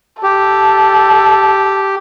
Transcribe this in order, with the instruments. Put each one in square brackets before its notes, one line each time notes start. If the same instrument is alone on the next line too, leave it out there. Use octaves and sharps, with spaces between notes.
[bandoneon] G4 [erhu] A4